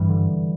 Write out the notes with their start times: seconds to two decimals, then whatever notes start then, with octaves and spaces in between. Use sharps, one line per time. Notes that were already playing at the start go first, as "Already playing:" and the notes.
Already playing: G2 E3 G3
0.09 D3